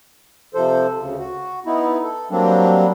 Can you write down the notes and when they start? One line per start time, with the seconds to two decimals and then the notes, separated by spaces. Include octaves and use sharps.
0.54 C3 F3 A4 C5
1.00 D2 C#3
1.18 F#4
1.66 B3 D#4 E4
2.03 A4
2.31 F#3 G3 A#3 C4 D4